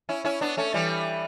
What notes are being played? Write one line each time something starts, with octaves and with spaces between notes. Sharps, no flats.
C#4 E4
C#4 E4
B3 D4
A3 C#4
E3 G3